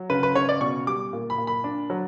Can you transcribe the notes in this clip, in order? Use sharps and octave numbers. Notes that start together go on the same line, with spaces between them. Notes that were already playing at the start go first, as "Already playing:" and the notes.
Already playing: F#3
C#3 B4
B4
C#3 C#5
D5
B2 C#6
G3 D6
A#2
B5
A#2
B5
D4
F#3